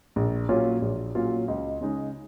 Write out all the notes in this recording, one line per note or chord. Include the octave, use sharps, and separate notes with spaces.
A#1
A#2 F#3 C#4 F4
A#1
A#2 F#3 C#4 F4
C#2
C#3 G#3 D#4